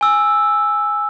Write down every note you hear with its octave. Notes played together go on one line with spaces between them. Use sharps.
G#5 E6